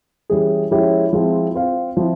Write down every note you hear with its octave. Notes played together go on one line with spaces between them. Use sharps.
E3 G3 C#4 E4 G#4
F3 G#3 C#4 E4 G4
F3 G#3 C4 E4
C4 F4 C5 F5
F3 C4 E4